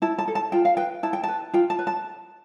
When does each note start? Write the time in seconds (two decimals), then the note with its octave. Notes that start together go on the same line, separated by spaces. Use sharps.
0.02 E4 A5
0.18 A5
0.28 A4
0.35 A5
0.52 F4 G5
0.65 F5
0.77 B4 G5
1.03 E4 A5
1.13 G5
1.24 A5
1.28 B4
1.53 F4 G5
1.70 A5
1.79 B4
1.87 A5